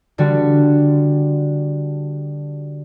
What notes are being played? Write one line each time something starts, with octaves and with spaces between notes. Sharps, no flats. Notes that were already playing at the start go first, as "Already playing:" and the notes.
D3 G3 F#4